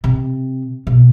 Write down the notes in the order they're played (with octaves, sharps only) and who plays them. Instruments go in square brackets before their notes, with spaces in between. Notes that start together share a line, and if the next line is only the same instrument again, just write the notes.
[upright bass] C3
B2